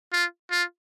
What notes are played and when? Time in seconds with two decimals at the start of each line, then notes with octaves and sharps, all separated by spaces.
0.13 F4
0.51 F4